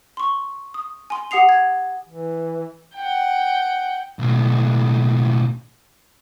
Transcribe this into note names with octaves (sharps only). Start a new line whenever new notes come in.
C6 C#6
D#6
G#5 C6
G4 F#5 D#6 C7 F7
G#6
E3
F#5 G5
B1 A2